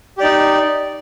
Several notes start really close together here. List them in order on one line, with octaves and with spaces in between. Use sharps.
G4 D5 D#4